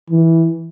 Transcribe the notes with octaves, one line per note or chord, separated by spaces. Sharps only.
E3